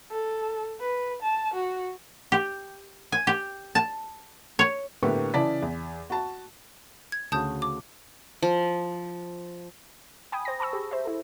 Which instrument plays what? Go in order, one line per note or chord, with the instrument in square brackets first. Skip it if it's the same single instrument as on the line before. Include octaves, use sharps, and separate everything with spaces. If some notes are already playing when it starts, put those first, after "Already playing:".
[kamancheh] A4
B4
A5
F#4
[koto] G4
G#5
G4
A5
C#5
[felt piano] A2 D3 A#3 B3 G4 C#6
C#3 E3 E4 D5 A5 B6
E2
F#4 A5
[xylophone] G#6
[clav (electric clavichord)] D2 C#3 F#4 [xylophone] A5 D#6 G6
[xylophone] D6
[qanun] F3
[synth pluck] G5 G#5 B5 D#6
C5 A#6
A5 B5 C#6 E6
G4 G#4
C5 E5
E4 A4